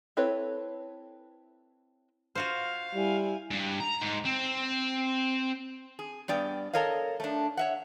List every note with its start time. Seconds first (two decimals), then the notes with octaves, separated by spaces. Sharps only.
0.17 C4 E4 A4 B4 C#5
2.35 F4 F#4 C5 F5
2.94 G3 E4 G#5
3.51 G2
3.80 A#5
4.02 G#2
4.25 C4
5.99 G#4
6.28 G2 B3 D5 G5
6.73 A4 A#4 C#5 D#5 F5
7.20 A3 D4
7.57 C#5 E5 F#5